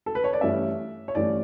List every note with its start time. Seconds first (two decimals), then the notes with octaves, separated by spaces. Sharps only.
0.06 A4
0.15 B4
0.24 C#5
0.33 D5
0.41 G2 E3 A3 C#4 E5
1.08 C#5
1.15 G2 E3 A3 C#4 D5